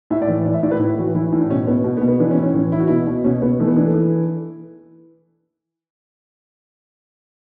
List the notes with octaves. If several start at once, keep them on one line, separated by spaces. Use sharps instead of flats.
A2 E5
D5
E3
A2 D5
E5
A2 D5
B4
A2 E4
E3 F#4
E3 E4
E4
A2
D4
B2 C#4
B2 B3
B2
B3
B2
B3
E3 D4
C#4
A2
C#4
E3 C#4
E3 E4
F#4
B2 E4
B2
B2 C#4
B2 B3
E3 A3
B3
E3 D4
A4
E3